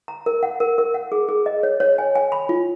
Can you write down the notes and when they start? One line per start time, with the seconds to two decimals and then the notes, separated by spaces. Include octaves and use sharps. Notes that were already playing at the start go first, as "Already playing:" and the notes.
0.08 A#5
0.26 A#4
0.43 F#5
0.60 A#4
0.78 A#4
0.94 F#5
1.12 G#4
1.29 G#4
1.46 D#5
1.63 C#5
1.80 C#5
1.98 G#5
2.15 G#5
2.32 B5
2.49 F4